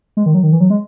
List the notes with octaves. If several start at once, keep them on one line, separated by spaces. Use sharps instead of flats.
G#3
D#3
F#3
D#3
E3
F#3
G#3